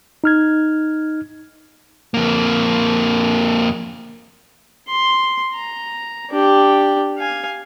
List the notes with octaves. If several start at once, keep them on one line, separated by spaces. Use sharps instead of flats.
D#4 F6 G#6
F2 A#3
C6
A#5
D4 G4
F5 G#5